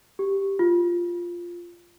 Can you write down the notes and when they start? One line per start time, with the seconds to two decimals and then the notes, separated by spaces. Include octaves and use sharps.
0.19 G4
0.59 F4